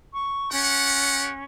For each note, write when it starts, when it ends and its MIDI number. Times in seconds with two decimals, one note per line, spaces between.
0.13 0.50 85
0.52 1.44 61
0.52 1.31 65
0.52 1.31 67
0.52 1.31 78